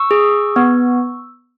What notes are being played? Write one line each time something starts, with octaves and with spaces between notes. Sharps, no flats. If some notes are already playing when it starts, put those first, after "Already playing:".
Already playing: C#6 E6
G#4
B3